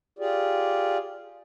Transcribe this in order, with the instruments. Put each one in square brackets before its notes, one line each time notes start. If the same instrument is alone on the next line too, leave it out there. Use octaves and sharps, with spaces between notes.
[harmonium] F4 G4 G#4 D5